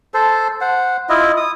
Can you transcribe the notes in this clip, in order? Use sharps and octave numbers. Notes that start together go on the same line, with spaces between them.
A4 C5
C5 F#5
E4 F4 D#5
D#6